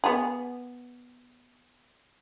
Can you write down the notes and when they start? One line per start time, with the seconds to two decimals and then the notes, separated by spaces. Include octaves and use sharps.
0.04 B3 G#4